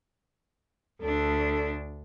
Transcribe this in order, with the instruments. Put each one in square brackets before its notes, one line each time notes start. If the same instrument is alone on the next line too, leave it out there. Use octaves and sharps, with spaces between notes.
[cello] D2 D4 [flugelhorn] A4